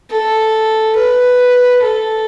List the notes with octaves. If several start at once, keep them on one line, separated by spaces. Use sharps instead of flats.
A4
B4
A4